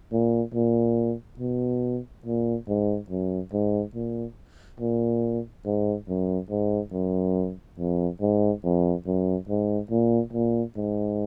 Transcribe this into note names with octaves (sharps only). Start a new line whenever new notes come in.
A#2
A#2
B2
A#2
G#2
F#2
G#2
A#2
A#2
G#2
F#2
G#2
F#2
F2
G#2
F2
F#2
G#2
A#2
A#2
G#2